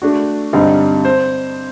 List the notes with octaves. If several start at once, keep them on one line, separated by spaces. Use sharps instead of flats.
A3 D4 F#4
G2 D3 G3 C4 D#4
C5